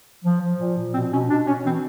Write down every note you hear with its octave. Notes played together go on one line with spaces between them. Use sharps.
F3
F3
A#2
A#2
B2 C4
B2 C#4
B2 D4
B2 C#4
E3 C4